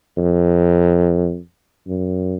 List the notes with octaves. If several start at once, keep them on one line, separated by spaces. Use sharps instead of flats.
F2
F#2